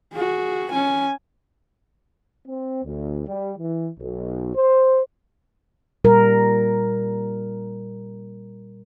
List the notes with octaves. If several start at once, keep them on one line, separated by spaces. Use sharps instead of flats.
F#4 G#4
C#4 G#5
C4
D2
G3
E3
B1
C5
A#2 G3 A#4